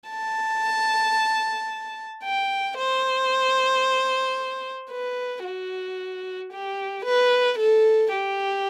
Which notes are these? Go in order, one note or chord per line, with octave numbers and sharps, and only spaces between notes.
A5
G5
C5
B4
F#4
G4
B4
A4
G4